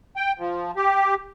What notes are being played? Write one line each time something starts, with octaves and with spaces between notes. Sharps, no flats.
G5
F3
G4